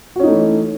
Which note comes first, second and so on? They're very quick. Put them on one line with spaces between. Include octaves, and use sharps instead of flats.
F#4 C#4 D#4 A3 E3